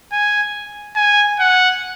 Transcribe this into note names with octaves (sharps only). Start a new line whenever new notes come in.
G#5
G#5
F#5